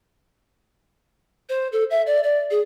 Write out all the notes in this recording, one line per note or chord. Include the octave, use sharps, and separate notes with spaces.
C5
A4
E5
D5
D5
G#4